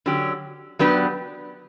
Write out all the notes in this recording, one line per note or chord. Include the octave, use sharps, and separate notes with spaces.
D3 F#3 C#4 G4
F#3 B3 D4 G4 B4